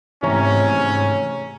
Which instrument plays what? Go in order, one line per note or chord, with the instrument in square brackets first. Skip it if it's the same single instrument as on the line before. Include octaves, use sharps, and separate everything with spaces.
[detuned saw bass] G#2 [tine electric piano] C3 A3 [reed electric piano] E3 C#5 A#5 [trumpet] C#4